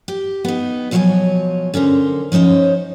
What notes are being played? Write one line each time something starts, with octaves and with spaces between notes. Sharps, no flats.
G4
B3 D#4
B2 F3 F#3 A#4 C#5 G#5
D3 C#4 A#4 C5
F3 C#4 D#4 C5 C#5